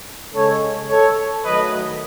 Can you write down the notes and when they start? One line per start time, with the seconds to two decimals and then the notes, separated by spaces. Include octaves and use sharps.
0.34 C#3 G#3 A4 C#5
0.89 A4 C#5
1.45 D#3 F#3 A3 B4 D#5